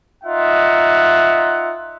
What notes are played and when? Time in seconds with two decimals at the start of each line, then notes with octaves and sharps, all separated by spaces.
0.24 D#4 F4 D#5 E5 F#5